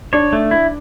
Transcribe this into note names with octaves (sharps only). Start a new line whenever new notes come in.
D4 C#5
A3
E4